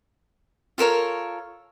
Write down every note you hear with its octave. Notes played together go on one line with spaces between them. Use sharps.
F4 A4 A#4 C#5